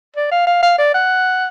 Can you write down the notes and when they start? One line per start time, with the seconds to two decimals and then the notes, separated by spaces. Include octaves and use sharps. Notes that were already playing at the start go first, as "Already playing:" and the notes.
0.17 D5
0.32 F5
0.47 F5
0.63 F5
0.79 D5
0.94 F#5